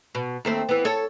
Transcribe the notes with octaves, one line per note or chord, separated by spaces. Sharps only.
B2
D#2 A3 C4
E3 B3
A4 C#5